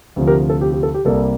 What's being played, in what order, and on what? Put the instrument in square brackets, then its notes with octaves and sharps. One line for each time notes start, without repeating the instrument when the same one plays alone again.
[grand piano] D2 C3 F3
G4 A#4
A4
G4
G4
A4
G4
C2 C3 G3 A#3 A4